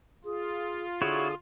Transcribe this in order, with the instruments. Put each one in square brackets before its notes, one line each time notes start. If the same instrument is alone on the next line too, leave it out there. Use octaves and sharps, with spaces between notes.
[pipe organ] F4 [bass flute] G#4
[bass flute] D3 [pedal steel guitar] E4 F#4 C#5 [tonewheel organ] G#4 D#6